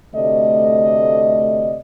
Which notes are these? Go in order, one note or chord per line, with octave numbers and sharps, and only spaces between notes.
D2 C3 A3 D5 D#5